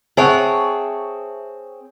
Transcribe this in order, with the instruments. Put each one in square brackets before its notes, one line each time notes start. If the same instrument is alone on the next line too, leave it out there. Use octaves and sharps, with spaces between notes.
[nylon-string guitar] C4 F#5 [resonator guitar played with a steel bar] G#4 C#5 [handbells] E5 A5 C#6